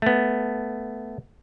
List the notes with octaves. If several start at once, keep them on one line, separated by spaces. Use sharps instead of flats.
A3 B3